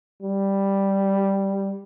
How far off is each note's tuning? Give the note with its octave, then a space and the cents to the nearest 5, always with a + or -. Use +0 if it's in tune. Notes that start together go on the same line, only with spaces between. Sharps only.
G3 +0